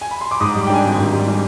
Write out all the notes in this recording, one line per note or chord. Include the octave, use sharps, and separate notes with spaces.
G#5
B5
C6
D6
G#2 D#6
D6
G3
G5
D4 G#5
G#1
G#2
G3
D4